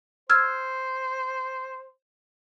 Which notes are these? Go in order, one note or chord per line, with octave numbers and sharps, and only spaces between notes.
C5 E6 F6 G#6